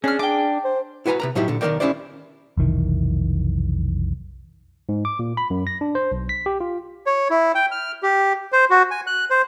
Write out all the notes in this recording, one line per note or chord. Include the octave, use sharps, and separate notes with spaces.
C#4 D4 G#4 F6
D4 G5 D6
C5
E4 F#4 B4 G#5 A#5
C3 B4 A#5
A2 F#3 D#4 E4 G4
A#2 D3
B1 D#3 B3 A#4 D5 G5
C#4 D4 E4 G4 C5 D5
F1 B1 D#3 E3
G#2
D6
A#2
B5
F#2
A#6
D4
C5
B1
B6
G4
F4
C#5
E4
G5
F6
G4
C5
F#4
G#5
F#6
C5